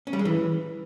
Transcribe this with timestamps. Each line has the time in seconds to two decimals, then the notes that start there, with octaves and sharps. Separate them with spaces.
0.07 C#4
0.13 G3
0.19 G#3
0.25 E3